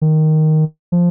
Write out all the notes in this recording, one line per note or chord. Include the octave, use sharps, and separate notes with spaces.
D#3
F3